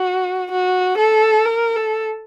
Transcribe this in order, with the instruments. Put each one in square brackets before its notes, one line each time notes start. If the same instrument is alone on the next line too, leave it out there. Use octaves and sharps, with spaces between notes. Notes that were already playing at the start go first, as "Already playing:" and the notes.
Already playing: [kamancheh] F#4
F#4
A4
A#4
A4